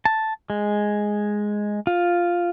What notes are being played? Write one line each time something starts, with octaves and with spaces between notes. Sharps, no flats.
A5
G#3
F4